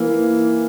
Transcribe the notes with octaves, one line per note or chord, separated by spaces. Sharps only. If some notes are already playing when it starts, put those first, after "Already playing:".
Already playing: E3 A#3